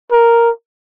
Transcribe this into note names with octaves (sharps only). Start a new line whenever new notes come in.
A#4